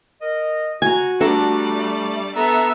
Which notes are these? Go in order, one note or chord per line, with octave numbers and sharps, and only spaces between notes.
A#4 D#5
F#4 G#5 A#5
G3 A3 D4 A4 D5 A#5
B3 A4 E5 A#5